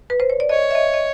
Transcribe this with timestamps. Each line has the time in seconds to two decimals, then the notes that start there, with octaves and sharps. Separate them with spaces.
0.10 B4
0.20 C5
0.30 C#5
0.40 D5
0.49 C#5 D#5
0.71 E5
0.75 D#5
0.94 D#5